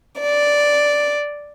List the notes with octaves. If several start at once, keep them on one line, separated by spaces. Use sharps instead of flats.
D5